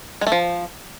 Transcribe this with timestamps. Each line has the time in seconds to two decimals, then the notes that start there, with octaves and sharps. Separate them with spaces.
0.21 G#3
0.27 A3
0.32 F3